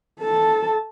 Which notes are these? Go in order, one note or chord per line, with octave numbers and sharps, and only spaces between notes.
A4 A5